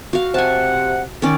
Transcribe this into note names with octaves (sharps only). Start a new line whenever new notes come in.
F#4 F5
C3 F#5 G#5 A5
D#3 C#4 D5